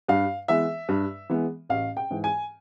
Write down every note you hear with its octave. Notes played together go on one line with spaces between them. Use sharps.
G2 F5
E3 G#3 B3 E5
G2
E3 G#3 B3
A1 F5
G5
G#2 E3
G#5